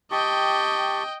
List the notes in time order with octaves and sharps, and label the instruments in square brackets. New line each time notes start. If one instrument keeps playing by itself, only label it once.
[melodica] G4 A5 C#6 [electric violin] D#5 G5